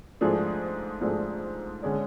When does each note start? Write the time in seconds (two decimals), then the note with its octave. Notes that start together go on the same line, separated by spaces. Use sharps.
0.21 G#2 F3 A3 D4 G#4
1.01 G#2 F3 A3 D4 G#4
1.82 D3 G#3 C#4 G#4 D5